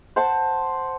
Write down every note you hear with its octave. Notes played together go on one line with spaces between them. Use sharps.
C5 F#5 A5 C6